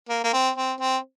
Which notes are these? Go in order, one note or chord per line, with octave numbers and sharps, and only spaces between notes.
A#3
A#3
C4
C4
C4